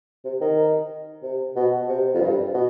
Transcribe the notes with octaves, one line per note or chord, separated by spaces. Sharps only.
C3
D#3
C3
B2
C3
F2
G2
B2